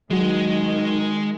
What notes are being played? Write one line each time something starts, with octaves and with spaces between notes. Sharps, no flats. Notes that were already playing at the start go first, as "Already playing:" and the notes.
D#3 F#3 G#3 F#4